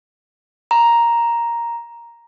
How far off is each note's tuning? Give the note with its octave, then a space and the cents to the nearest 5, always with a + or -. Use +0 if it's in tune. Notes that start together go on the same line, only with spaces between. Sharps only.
A#5 +5